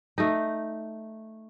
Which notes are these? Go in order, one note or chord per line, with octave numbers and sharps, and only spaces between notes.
A3 D#4